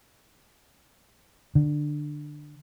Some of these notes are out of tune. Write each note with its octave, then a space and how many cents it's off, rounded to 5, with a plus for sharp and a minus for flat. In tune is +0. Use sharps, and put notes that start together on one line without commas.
D3 +15